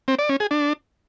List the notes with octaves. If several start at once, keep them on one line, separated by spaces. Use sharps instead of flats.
C4
D5
C#4
G#4
D4